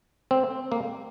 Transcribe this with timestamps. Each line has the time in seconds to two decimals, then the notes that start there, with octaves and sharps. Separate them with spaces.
0.31 C4
0.72 A#3